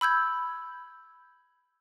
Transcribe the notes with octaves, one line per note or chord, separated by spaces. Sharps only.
B5 E6 G6 G#6